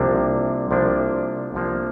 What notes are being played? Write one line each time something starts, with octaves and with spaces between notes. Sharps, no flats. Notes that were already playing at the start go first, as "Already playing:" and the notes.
Already playing: C2 C3 F3 A#3 D4
C2 C3 F3 A#3 D4
C2 C3 F3 A#3 D4